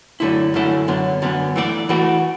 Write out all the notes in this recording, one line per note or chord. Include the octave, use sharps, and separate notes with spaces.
F#2 D3 A3 E4
F#2 D3 A3 E4
F#2 D3 B3
F#2 D3 B3
E3 A3 F#4 D5
E3 A3 F#4 D5